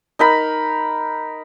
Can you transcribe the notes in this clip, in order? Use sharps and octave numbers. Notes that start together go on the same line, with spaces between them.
D#4 A#4 B5